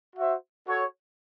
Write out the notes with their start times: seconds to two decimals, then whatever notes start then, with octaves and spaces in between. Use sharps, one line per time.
0.16 F#4 C5 E5
0.66 F#4 A4 C#5